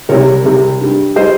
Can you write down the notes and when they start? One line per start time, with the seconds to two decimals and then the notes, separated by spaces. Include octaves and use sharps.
0.09 C2 C3 G3 A#4 C#5
0.45 C2 C3 G3
0.80 G2 G3
1.16 G3 C5 D#5